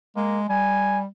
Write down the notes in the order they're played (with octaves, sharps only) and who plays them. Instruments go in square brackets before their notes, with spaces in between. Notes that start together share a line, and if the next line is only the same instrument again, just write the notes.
[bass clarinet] G#3 [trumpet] A#3
[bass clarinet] G3 [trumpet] G#5